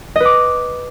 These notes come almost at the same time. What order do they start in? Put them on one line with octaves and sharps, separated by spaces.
D#5 B4 D6